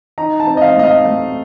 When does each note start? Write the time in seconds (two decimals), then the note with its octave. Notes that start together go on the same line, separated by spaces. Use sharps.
0.18 D#4 A#5
0.40 A5
0.47 C4
0.57 D#5
0.61 F5
0.76 A2 D#5
0.84 F5
1.05 A3